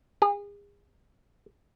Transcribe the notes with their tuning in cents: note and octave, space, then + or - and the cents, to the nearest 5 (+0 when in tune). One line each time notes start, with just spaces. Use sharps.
G#4 -35